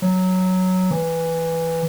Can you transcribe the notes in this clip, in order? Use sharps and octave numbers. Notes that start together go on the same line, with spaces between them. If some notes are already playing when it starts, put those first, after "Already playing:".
F#3
E3